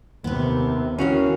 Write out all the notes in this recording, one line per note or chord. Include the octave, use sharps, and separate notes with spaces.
D#2 C3 B3 B4
D#3 E3 C#4 F#4 F5